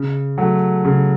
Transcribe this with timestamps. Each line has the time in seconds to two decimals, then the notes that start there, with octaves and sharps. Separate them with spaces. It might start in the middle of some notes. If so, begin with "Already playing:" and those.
Already playing: C#3
0.38 F#3 A3
0.85 C#3